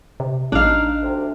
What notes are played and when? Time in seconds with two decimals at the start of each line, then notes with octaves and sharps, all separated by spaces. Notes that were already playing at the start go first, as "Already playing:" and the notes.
0.20 C3
0.52 A1 D4 D#4 F5
1.02 D2 C3